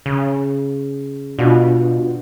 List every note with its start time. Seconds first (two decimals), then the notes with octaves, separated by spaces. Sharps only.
0.06 C#3
1.39 B2 D4 F4 F#4